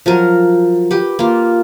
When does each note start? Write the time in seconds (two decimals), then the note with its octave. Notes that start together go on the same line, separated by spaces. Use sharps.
0.06 F3 F#3 A#4
0.91 G4 B4 G5
1.19 A#3 F4